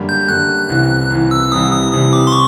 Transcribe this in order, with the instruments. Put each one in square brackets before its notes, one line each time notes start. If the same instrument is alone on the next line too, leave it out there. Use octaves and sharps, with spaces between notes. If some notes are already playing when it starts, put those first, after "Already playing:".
Already playing: [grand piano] F#2 D3 G3 A#3
[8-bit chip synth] G6
[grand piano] F#2 D3 G3 A#3 [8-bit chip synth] F#6
[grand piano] C2 C3 E3
C2 C3 E3
[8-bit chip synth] E6
[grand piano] C2 C3 E3 G3 [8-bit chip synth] D#6
[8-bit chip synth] D#6
[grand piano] C2 C3 E3 G3 [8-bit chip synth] D#6
[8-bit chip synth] D6
C6
C#6